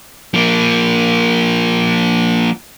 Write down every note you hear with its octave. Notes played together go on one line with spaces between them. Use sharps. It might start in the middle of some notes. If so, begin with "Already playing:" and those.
F3 A#3